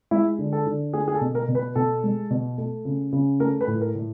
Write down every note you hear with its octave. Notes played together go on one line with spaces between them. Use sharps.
G#3 E4
D3
A4
D3
A3 G#4
G#4
A4
B2
A#4
B2
B4
B2 A4
G#3
B2
A3
C#3
C#3
A3 A#4
B4
A2
A#4
A2